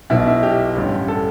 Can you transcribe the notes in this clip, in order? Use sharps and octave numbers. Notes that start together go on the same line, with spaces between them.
B1 B2 E4
E4
G4
A1 G2 D3
A4